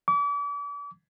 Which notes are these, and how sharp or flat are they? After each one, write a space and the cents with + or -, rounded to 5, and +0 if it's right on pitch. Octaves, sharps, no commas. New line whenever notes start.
D6 -40